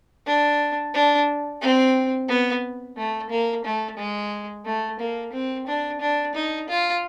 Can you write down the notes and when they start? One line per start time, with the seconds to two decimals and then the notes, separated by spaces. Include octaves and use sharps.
0.27 D4
0.94 D4
1.61 C4
2.29 B3
2.97 A3
3.30 A#3
3.65 A3
3.98 G#3
4.65 A3
5.00 A#3
5.33 C4
5.67 D4
6.01 D4
6.35 D#4
6.69 F4